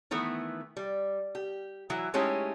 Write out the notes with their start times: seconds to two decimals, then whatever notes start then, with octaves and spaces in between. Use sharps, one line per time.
0.11 D#3 E3 A3 B3
0.77 G3
1.35 G4
1.90 E3 F#3 E4
2.14 G#3 A3 C#4 D#4 E4 G4